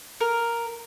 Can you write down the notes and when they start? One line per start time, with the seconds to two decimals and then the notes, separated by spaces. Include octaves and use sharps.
0.21 A#4